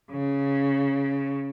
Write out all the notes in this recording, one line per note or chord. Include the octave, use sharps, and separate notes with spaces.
C#3